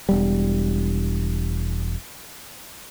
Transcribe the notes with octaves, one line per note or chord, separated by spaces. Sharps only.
E1 G3